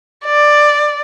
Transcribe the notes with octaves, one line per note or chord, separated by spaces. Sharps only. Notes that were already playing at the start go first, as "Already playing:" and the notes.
D5